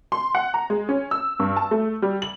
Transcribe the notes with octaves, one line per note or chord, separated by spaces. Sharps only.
C6
F#5
A#5
G#3
C#4
E6
G2
A5
A3
G3
F#7